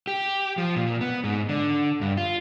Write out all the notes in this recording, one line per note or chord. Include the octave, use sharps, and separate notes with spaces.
G4
F3
A#2
B3
G#2
D3
G2
F4